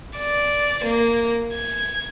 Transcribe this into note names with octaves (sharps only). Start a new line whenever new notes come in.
D5
A#3
G#6